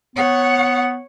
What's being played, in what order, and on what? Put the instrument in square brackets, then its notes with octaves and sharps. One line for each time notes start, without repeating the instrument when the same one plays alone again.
[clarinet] B3 [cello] C#5 F#5